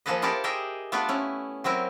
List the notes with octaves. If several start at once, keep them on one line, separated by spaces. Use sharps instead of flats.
F3 A#3 G#4 A4 B4 D#5
E4 F4 G4 A4 A#4 D5
G4 G#4 A#4 D#5 E5 G5
A3 B3 D4 F4 B4 D5
C#4 E4
F#3 C4 E4 A#4